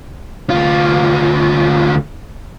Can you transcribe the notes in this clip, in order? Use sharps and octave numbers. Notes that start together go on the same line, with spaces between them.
D2 F4